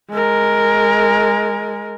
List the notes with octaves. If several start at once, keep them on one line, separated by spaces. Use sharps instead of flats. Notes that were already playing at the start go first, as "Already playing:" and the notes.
G#3 A#4